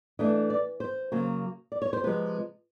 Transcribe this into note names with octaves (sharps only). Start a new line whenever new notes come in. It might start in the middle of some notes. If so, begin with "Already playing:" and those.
E3 A3 D4 D#5
D5
C5
C#3 F#3 A#3
D5
C#5
C5
C3 F3 G#3 B4